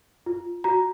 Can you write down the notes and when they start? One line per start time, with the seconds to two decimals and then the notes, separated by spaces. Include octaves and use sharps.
0.26 F4
0.64 F#4 A#5